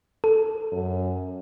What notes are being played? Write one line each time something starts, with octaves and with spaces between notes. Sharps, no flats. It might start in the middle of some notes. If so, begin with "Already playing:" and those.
A4
F#2